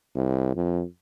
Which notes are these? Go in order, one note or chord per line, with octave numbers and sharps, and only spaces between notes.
C2
F2